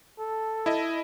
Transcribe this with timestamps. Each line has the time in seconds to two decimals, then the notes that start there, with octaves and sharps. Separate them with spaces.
0.19 A4
0.66 E4 D#5